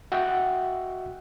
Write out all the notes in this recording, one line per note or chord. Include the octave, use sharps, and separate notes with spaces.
F#4 D#5 E5 F#5 G5